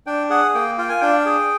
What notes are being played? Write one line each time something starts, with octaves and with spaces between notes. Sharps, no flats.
D4 G5
G#4 F#5
A#3 G5
F4 G5
G#5
D4 G5
G#4